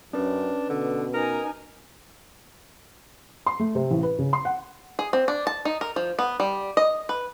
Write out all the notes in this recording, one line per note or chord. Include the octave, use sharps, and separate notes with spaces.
F#2 C#4 D4 B4
B2 D3
D#4 A#4 G#5
C6
A3
C3
A1
B4
C#3
C6
F#5
G#4
C4
D4
A5
D#4
A#4
F3
B3
G3
D#5
B4